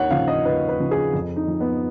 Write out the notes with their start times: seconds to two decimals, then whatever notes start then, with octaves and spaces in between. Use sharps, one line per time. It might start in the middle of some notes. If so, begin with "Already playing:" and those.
Already playing: D#2 C#5 F#5
0.10 C#3 F3 F5
0.28 D#5
0.45 D#2 B4
0.69 B4
0.80 C#3 F3
0.91 G#4
1.13 F2
1.36 D#4
1.48 F3
1.60 B3